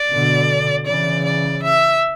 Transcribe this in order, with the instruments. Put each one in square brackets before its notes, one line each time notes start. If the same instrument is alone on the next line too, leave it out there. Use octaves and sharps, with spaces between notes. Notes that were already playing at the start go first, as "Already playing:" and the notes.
Already playing: [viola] D5
[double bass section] B2 D3
[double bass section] C#3 E3 [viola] D5
[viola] D5
E5